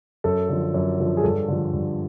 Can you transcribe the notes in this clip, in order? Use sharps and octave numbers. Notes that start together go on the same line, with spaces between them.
F#2 A4
D3 F3
F#2
D3 F3
G#4
G2 A4
D3 F3
G2